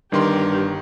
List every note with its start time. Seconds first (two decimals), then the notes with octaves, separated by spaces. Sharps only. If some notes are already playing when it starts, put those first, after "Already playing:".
0.12 G1 G2 D#3 G4 A#4 C6